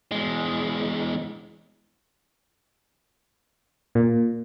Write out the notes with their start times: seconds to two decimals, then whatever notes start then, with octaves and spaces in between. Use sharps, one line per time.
0.12 E2 G#3
3.95 A#2